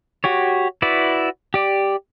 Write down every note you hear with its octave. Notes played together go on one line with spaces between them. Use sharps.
F#4 G4 C#5
E4 F#4 B4 D5
G4 D5